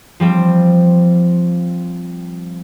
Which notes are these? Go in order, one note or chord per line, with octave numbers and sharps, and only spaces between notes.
F3 G3 C4